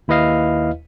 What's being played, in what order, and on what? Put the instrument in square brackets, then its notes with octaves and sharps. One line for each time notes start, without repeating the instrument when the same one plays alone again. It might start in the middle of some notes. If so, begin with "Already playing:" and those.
[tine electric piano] D#2 E4 B4 D#5 F5